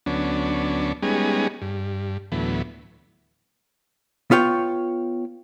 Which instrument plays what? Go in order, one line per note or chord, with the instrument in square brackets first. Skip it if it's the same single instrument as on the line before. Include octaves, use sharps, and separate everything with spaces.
[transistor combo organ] D2 F#3 B3 C#4 D4
G3 G#3 B3 C#4 D#4 G#4
G2
D2 A2 E3 F#3 B3
[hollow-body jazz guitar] B3 F4 C#5 G5